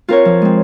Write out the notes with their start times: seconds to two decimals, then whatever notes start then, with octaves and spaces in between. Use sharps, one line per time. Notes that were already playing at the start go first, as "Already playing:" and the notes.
0.08 C4 F4 A#4 C#5
0.25 F3
0.42 G#3 C4